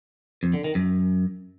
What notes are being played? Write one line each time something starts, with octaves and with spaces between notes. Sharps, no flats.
F2
D3
D#3
F#2